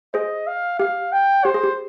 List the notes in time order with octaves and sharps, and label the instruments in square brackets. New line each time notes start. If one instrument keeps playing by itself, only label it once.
[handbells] G#4 C5 [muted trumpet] D#5
[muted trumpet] F5
[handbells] G4 [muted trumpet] F5
[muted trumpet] G5
[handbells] G4 [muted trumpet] C5
[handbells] G#4
G4